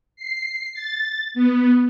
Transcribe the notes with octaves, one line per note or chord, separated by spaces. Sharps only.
C7
A6
B3